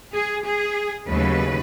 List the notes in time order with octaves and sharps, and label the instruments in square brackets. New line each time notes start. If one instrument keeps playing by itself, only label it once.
[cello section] G#4
G#4
D#2 C#3 F#3 A3 B4